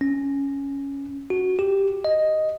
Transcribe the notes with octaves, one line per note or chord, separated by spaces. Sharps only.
C#4
F#4
G4
D#5